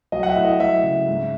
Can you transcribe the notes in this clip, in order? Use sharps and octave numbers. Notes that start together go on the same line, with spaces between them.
F#3 D#5
F#5
E5
A2
D#5
F#3 E5
C#3
G#2